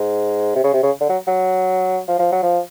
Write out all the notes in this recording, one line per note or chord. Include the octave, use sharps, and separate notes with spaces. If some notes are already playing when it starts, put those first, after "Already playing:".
Already playing: G#2
C3
C#3
C3
C#3
D3
F#3
F#3
F3
F3
F#3
F3